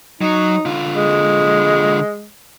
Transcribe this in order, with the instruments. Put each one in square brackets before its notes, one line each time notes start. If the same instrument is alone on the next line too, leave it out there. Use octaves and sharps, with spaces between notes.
[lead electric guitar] F#3 [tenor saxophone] D#4
[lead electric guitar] D3 F4
[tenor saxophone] G#3